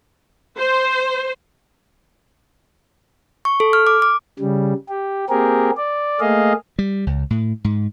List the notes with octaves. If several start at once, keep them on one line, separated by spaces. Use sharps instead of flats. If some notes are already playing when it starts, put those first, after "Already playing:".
C5
C#6
A4
F6
D6
D6
C#3 G3
G4
A#3 C4 G4 G#4 A#4
D5
A3 A#3 G#4 D#5 F5
G3
C#2
A2
G#2